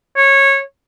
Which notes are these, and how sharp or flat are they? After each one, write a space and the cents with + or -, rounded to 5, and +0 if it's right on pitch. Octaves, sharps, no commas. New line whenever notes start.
C#5 -15